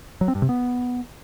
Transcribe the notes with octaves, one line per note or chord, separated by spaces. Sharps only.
F#3
C4
G2
C3
B3